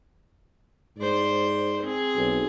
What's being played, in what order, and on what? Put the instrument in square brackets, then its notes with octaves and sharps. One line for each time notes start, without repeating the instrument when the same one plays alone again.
[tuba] G#2 [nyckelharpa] C5 D5
[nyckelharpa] C4 G#4
[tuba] B1